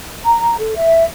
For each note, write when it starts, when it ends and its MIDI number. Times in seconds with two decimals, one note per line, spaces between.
0.24 0.57 82
0.58 0.76 69
0.76 1.04 76